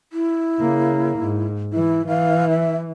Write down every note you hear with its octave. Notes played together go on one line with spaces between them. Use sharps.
E4
C#3 A#3
G#2
E3 E4
E3 F5
E5